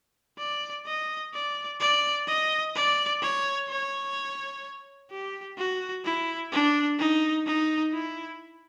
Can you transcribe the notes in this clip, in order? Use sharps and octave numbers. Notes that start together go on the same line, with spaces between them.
D5
D#5
D5
D5
D#5
D5
C#5
C#5
G4
F#4
E4
D4
D#4
D#4
E4